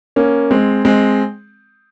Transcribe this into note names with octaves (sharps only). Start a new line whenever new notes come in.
A#3 C#4
G#3 C4
G#3 C4